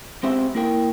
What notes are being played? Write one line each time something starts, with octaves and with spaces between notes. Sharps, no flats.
G#3 B3 C4 G4 E5
A#3 E4 A#4 G5